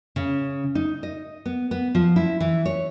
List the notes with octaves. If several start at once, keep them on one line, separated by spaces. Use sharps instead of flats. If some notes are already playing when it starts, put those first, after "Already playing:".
C#3
D#4
D#5
B3
B3
F3
E4
E3
C#5